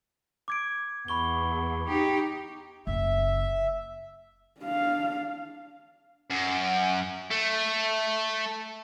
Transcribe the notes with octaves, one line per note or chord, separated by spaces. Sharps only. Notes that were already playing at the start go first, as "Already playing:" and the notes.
D6 G#6 D7
E2 B5 C#6 G7
D#4 G4
F#1 E5
D4 F5
F#2
A3